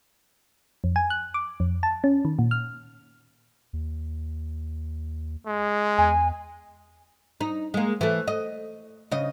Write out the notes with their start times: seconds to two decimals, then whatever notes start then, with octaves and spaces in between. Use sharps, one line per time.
0.84 F2
0.96 G#5
1.10 F#6
1.34 D6
1.60 F2
1.83 A5
2.04 C#4
2.25 D#3
2.39 A#2
2.51 F6
3.73 D#2
5.46 G#3
5.98 E2 G#5
7.41 D#4
7.74 G#3 A#3
8.01 E3 A3
8.28 D#5
9.11 C#3 D#5